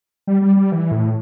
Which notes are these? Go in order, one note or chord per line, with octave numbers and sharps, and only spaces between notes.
G3
G3
G3
E3
A2